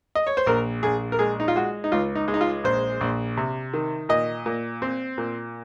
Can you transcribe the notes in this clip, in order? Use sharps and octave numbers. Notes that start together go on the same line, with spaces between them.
D#5
C#5
C5
A#1 A#4
A#1 G#4
A#4
G#3 G#4
D#4
F4
G#3 F#4
D#4
C#2 F4
D#4
G#3
D#4
F4
A#1 C5
A#1
C3
D#3
A#2 D#5
A#2
C4
A#2